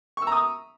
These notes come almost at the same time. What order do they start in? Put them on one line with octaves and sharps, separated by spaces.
C#6 E6 A#5 D#6